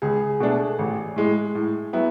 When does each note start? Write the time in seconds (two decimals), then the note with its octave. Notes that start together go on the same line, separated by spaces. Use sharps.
0.02 C#2 G#4
0.40 B2 A3 D4
0.79 A1
1.16 A2 G#3
1.55 A2
1.93 F#3 B3 E4